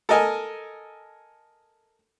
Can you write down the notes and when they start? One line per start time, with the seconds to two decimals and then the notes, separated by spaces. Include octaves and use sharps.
0.09 A4 A#4 D#5 G#5